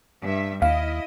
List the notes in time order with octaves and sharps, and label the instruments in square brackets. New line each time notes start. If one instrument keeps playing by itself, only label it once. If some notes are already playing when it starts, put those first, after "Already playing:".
[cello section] G2 E5
[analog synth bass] D#2 [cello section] E4 D#5 [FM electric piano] F5